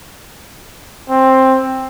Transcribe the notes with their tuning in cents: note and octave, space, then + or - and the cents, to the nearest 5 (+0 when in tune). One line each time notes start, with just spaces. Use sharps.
C4 +10